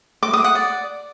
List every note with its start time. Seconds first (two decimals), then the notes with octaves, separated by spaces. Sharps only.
0.23 D6
0.33 D#6
0.44 F#5
0.55 D5